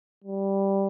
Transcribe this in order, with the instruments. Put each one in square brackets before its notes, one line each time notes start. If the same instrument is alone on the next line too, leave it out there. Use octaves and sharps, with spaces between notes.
[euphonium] G3